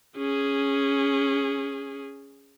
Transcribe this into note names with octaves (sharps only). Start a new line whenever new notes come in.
C#4 G#4